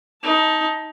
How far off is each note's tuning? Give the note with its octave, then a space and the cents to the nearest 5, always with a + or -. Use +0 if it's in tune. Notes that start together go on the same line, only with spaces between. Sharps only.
D#4 +20 A5 +0